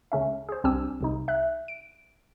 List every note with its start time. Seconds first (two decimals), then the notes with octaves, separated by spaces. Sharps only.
0.12 C#2 C#3 C#4 E5
0.49 G#4 C5
0.64 C2 C4 D4 G4 G#5 E6
1.01 C2 C3 D#4
1.28 E5 F#6
1.68 D7